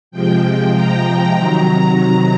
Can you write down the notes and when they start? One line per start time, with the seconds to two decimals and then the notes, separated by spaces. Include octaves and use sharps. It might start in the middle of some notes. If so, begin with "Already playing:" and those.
0.11 C3 F3 G#3 G5
0.73 A#5
1.34 C3 D#3 F#3